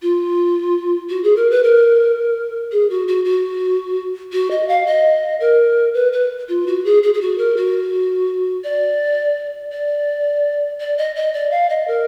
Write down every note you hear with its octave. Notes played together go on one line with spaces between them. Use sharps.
F4
F#4
G#4
A#4
B4
A#4
G#4
F#4
F#4
F#4
F#4
D#5
F5
D#5
A#4
B4
B4
F4
F#4
G#4
G#4
G#4
F#4
A#4
F#4
D5
D5
D5
D#5
D#5
D5
F5
D#5
A#4